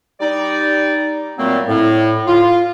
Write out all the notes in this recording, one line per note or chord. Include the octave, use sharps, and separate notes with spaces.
G3 D#4 D5
A#2 F#3 G3 A3 A#3 C4
A2
F4